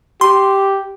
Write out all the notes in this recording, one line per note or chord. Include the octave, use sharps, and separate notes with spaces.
G4 C6